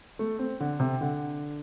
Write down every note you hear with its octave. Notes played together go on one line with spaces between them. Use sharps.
A3
C4
D3
C3
D3